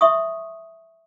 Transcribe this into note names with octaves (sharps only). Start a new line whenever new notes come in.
E5 C6 C#6 D#6